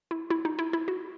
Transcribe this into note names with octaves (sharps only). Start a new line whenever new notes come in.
E4
E4
D#4
E4
E4
F#4